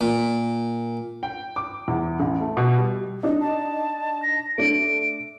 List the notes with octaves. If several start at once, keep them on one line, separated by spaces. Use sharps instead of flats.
A#2
G5
D6
E2
A1
A3
B2
G3
D4 D#4
A5
A#6
A3 D4 D7